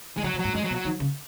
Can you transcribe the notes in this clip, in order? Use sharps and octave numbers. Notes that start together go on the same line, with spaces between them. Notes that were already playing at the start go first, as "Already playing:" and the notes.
D#3 G#3
C#3 F#3
B2
F#3
G#2
F#2 G#3
F#3
B2
F#3
D#3
C#3